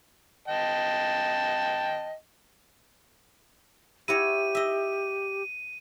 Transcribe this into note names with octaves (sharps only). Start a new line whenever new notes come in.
D#5 G5 A5
E4 F#4 G4 C#5 D#7
D#5 E5